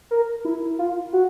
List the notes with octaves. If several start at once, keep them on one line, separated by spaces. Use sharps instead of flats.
A#4
E4
F4
F#4